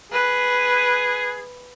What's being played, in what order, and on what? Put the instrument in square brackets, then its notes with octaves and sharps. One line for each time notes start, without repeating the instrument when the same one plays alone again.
[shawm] G#4 [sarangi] B4